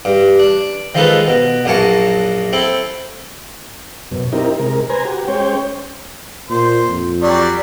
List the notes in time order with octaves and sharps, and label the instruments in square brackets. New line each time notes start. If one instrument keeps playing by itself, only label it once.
[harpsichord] G2
D4
D#3 F3 G#3 D#4 A4 B4
B2
A#1 F#2 A#3 G#5 A5 C#6
C4 E4 A4
[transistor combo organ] F#2 B2
C4 D#4 E4 G4 A#4
C3 G#3 A#4
B4 C5 G#5 A#5
F#4 G4
G#3 C#4 C5 C#5 G5
[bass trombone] A#2 [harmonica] C5
[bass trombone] F2
[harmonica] F#3 G3 [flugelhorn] D5